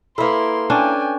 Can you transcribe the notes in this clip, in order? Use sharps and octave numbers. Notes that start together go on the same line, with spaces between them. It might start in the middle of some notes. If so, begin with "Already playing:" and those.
A#3 E4 A4 B4 C6
C#4 D4 G5 G#5